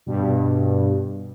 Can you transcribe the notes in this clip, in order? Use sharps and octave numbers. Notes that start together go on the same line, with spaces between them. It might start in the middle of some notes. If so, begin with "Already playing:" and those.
G2 B2